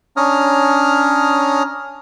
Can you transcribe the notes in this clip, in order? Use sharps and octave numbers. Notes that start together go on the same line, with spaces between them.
C#4 D4 C#5 A#5 D#6 F6